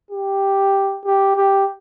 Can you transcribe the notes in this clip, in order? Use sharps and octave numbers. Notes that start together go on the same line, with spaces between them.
G4
G4
G4